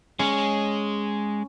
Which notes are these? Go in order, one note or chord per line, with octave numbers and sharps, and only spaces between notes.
G#3 C#4